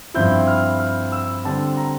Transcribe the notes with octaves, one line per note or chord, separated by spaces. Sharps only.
G2 F3 C4 E4 G6
F6
F6
E6
D3 G3 C4 A5
A#5